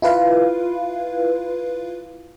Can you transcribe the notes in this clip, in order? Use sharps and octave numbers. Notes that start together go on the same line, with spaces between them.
E4 F4 B4 F5